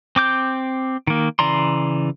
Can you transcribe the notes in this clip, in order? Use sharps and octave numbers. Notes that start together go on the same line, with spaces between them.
C4 D6 G6
D#3 A#3
C#3 E3 D5 A#5 C6